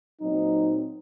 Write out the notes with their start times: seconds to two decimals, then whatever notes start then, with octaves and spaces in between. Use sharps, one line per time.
0.21 A#2 F#3 C4 D#4